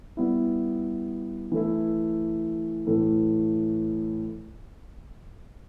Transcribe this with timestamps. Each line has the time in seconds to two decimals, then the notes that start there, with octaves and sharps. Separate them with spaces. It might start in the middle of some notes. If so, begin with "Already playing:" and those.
0.17 G3 B3 E4
1.52 E3 A3 E4
2.87 A2 E3 A3